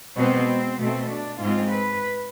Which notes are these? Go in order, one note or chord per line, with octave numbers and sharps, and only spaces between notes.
B2 G#3 B3 C4
B2 A3 C4
D4
G#2 G#3 C4 F4
B4